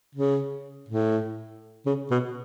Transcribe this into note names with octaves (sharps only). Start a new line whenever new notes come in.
C#3
A2
C#3
B2